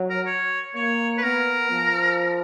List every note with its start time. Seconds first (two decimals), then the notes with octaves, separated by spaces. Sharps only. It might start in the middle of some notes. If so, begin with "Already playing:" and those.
Already playing: F#3
0.10 A#4
0.26 C#5
0.75 A#3 C#5
1.18 B4
1.23 B3 A#4
1.70 F3